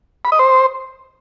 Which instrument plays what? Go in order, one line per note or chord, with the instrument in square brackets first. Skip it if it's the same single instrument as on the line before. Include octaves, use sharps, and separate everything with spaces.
[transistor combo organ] B5
D#5
C5